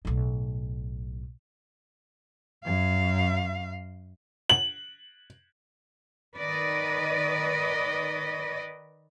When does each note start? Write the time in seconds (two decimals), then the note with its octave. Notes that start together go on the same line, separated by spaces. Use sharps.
0.05 B1 A2
2.65 F#2 F5
4.50 F#7
6.36 D#3 B4 D5 D#5